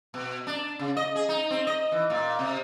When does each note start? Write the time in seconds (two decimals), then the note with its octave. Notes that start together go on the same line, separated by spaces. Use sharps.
0.14 B2
0.47 D4
0.79 C#3
0.97 D#5
1.15 G#4
1.29 D#4
1.51 C4
1.67 D#5
1.92 E3
2.10 A#2
2.39 C3